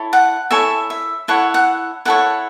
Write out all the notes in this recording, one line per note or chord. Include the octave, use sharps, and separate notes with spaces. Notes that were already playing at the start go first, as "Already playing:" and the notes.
Already playing: E4 A4 C#5
F#5
E4 A4 C#5 E5 G#5
E5
E4 A4 C#5 F#5
F#5
E4 A4 C#5 F#5